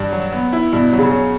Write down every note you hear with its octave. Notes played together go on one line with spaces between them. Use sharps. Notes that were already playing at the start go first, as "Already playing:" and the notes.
Already playing: G2
F#3
B3
E4
G2 B2
F#3
C#3
C#4